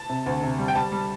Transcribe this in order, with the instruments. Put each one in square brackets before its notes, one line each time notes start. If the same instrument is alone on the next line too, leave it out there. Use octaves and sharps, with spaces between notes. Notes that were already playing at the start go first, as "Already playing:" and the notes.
Already playing: [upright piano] A5
C3
D2
C3
G3
G5
G3 A5
G3